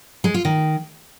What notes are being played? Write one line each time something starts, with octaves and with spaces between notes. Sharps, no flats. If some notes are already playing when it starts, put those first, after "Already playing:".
G#3
F4
D#3